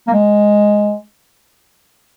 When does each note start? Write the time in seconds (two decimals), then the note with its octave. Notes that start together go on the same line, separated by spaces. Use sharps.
0.07 A#3
0.13 G#3